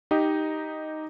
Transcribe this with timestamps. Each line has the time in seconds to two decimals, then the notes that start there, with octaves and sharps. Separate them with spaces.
0.11 D#4 G4 D#5